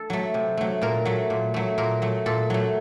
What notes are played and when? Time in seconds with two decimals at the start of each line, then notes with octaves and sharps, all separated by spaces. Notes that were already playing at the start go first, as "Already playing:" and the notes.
Already playing: A4
0.10 F#3 A3
0.34 C3
0.57 F#3 A3
0.82 A#2 A#4
1.05 F#3 A3
1.30 A#2
1.54 F#3 A3
1.78 A#2 A#4
2.02 F#3 A3
2.26 A#2 A4
2.50 F#3 A3